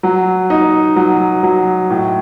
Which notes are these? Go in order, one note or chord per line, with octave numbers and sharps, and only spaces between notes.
F#3
D#4
F#3
F#3
A2